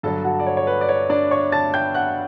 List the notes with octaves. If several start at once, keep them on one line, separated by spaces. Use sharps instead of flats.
G2 D3 F#3 A4 A5
F#4 F#5
D5
C#5
C#5
B4
D5
C#5
D4 D5
C#5 C#6
A5 A6
G5 G6
F#5 F#6